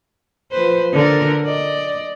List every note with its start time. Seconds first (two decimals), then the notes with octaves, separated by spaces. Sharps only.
0.51 F3 B4 C5
0.92 D3 A#4
1.45 D5 D#5